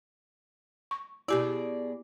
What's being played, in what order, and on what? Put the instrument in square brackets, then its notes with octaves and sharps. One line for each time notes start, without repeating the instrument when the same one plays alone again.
[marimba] C#6
[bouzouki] B2 G#4 D5 [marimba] E4 G4